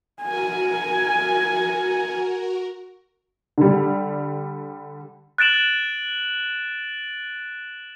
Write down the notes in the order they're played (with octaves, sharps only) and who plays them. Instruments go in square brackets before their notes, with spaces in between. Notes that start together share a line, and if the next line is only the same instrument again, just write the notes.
[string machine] F#4 A#4 [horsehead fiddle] G#5
[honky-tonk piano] D3 G3
[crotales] F#6 A6 D7 E7 F#7